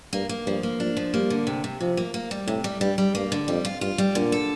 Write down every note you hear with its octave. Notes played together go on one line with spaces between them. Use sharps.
G2 A#3
A#3
G2 F3
A#3
F3 D4
F3
G3 A#3
D3
C3
C3
C3 F3
A#3
A#3
G3
A2 C3
G3
G2 G3
G3
G2 A#3
D3
F2 G3
F4
G2 F4
G3
A#2 D3
A4